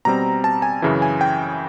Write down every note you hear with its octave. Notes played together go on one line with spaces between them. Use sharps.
B2 G3 C4 A#5
A5
G#5
F#2 C#3 E3
G#5
G5